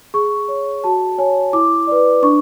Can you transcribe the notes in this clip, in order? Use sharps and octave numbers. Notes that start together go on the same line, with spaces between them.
G#4 C#6
C#5
F#4 A5
C#5 G#5
E4 D6
B4 D5
D4 C#6